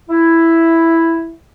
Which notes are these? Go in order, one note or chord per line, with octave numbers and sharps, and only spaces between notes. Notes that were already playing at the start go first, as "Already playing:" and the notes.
E4